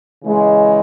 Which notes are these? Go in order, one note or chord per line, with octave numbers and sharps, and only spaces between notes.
C#3 E3 G#3